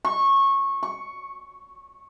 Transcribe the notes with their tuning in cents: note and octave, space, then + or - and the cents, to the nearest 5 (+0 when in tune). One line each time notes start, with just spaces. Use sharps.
C#6 -20
C#6 +5